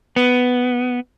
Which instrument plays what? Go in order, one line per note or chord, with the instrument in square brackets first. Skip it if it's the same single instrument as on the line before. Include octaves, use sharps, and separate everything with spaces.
[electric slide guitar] B3